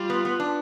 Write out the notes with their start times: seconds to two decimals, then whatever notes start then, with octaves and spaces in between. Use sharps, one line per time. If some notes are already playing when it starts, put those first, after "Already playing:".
Already playing: G3 F4
0.10 B3
0.25 B3
0.40 D4